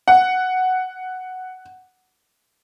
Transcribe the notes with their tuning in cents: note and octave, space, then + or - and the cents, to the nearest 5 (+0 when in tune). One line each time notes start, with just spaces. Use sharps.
F#5 +5